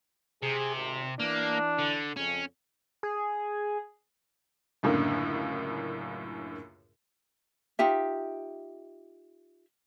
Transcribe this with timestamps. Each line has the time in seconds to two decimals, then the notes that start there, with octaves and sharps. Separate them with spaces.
0.42 C3 G#4
0.76 G#1
1.20 E3 A#3 D4
1.78 D3
2.16 F2 C#3 C#4
3.03 G#4
4.83 C#2 F#2 A2 D3 A#3
7.79 D#4 F4 G4 E5